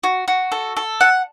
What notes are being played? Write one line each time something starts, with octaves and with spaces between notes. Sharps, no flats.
F#4
F#4
A4
A4
F#5